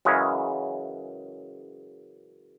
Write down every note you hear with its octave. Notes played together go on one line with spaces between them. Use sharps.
F#2 C#3 E3 G#3 C#4